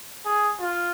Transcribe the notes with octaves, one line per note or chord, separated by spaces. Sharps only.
G#4
F4